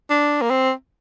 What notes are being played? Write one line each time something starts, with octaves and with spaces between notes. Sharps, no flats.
D4
A#3
C4